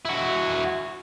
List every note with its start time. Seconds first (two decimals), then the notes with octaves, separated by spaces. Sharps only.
0.05 E4 F#4